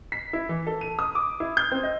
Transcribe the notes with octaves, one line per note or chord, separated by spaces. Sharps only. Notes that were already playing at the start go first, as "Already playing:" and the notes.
B6
E4
E3
A4
D#7
D#6
D6
E4
G6
C4
D#5